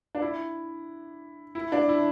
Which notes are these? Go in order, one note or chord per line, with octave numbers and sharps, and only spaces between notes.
D4
E4
E4
D4
E4